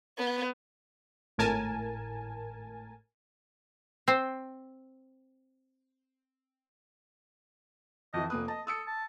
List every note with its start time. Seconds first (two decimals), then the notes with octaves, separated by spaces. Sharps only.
0.18 B3
1.38 G#1 A2 A#4 G#5 A5
4.08 C4 C5
8.14 F2 E3 D#5
8.30 F1 A#3 B4 D#6
8.48 D#5 A5
8.67 A4 D#6 E6 C#7
8.87 A5